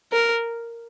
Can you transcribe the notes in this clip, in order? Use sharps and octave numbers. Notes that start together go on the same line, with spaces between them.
A#4